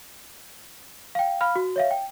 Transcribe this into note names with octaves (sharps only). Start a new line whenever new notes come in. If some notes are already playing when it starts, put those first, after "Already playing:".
F5 G5
F5 B5 F6
F#4
C#5 E5 F5
G5